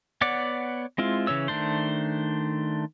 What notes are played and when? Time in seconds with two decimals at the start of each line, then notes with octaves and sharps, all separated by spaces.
0.21 B3 C#5 D5 F#5 D6
0.98 G#3 C4 E4 F4
1.27 C#3 E3 C#5 E6
1.48 D#3 A3 D4 C5